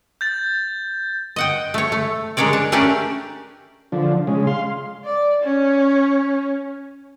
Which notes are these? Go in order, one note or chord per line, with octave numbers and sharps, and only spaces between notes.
G6 A6
D#5 F#5 G5
A3 C#5
A3
G#3 D4 A#4 C#5 D5
D4
A3 C#4 D4 G4 A#4 D5
D3 F3
C#3 G#3
F5 C6
D5
C#4